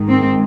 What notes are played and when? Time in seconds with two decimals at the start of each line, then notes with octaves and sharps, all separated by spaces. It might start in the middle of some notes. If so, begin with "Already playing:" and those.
Already playing: G#2 D#3 G#3
0.09 C4